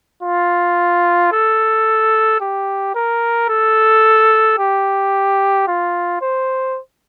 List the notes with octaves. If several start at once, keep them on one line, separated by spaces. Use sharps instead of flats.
F4
A4
G4
A#4
A4
G4
F4
C5